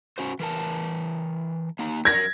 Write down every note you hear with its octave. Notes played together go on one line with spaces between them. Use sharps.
C#4 F#4 C5
E3 A#4 A5
A#3 D#4
F#3 A#4 G#6 A#6